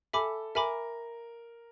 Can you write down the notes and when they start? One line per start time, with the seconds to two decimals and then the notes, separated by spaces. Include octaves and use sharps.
0.13 A4 E5 G#5 B5 D6
0.55 A#4 E5 G#5 B5 D6